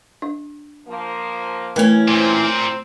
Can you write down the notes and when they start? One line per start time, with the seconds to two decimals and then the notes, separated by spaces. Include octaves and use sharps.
0.22 D4
0.87 F3 A#3
1.76 E3 A3 C#4 A#4
2.08 A#2 C4